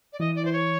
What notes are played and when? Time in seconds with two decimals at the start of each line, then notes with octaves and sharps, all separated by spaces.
0.13 D5
0.19 E3 D#5
0.36 D5
0.44 E3 C5
0.53 C#5